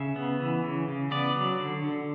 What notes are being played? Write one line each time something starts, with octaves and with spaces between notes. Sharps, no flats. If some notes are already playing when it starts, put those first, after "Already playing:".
Already playing: C#3 E5
B3
E3
C#3
C#3
B3 D5
F#3
D3
D3